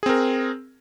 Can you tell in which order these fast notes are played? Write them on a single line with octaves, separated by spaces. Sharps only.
G#4 C4 A#4